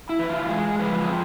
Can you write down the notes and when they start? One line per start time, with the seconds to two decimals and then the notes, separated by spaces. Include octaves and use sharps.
0.09 E4
0.19 E3
0.29 F4
0.49 G#3 G#4
0.79 F3 B4
1.04 G#4
1.09 C4 F4